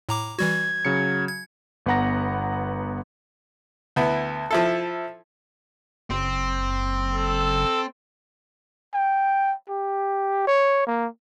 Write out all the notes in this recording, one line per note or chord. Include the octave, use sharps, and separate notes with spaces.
A2 A#5 D6
E3 G3 F#4 G#6
C#3 F#3 C#7
G#6
G1 B3 B4 F#5 A#5 A#6
D2 B3 E4
F3 E4 A4
F#1 C4
A4
G5
G4
C#5
A#3